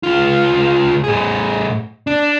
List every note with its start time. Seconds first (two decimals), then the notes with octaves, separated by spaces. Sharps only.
0.03 C#2 F4
1.04 A2 G#4
2.07 D4